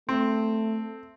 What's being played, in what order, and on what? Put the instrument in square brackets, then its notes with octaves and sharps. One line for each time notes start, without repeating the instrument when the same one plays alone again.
[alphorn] A3 [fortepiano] C4